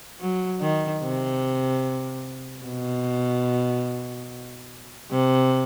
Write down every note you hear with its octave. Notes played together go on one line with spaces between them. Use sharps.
F#3
D#3
C3
B2
C3